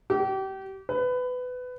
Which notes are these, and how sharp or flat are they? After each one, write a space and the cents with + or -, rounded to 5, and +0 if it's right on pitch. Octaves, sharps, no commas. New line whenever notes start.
G4 -30
B4 +20